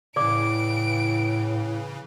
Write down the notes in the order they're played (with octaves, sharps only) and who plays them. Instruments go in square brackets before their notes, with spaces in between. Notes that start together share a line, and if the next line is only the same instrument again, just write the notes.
[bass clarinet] A2 [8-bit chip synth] C#3 E3 [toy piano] D5 D6 [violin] D7